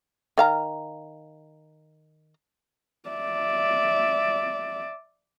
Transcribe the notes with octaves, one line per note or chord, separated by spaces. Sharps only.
D#3 F5 A#5
D5 E5